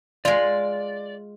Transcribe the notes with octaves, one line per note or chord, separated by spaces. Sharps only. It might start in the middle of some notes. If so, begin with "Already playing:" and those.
G#3 F4 D5